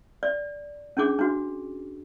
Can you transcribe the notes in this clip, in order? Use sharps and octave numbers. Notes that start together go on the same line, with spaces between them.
D5
C#4 D4 G#4 D6
D4 F#4